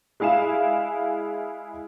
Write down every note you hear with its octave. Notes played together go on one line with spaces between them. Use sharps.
G#3 E4 F5 G#5 E7